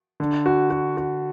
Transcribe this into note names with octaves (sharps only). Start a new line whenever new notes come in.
D3
F#4
F#4
F#4